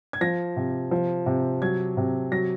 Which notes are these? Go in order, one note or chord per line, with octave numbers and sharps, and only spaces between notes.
G#6
F3 A#6
C3
F3
C3
F#3 G#6
C3
F#3 A#6